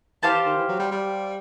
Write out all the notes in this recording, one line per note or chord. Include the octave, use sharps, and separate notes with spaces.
E3 G4 C5 F5 A5
D#3
E3
F#3
G3
G3